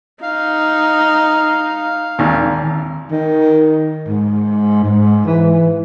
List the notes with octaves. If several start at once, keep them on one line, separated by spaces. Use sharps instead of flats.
D#4 F5
G#1 D#2 A#2
D#3
G#2
G#2
E3